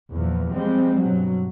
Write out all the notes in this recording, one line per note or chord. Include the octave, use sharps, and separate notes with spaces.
E2 A#2 E3 F3
F3 G3 G#3 C4
G2 B2 F#3